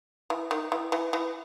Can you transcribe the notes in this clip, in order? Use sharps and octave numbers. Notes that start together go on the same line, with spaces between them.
E3
D#3
E3
E3
E3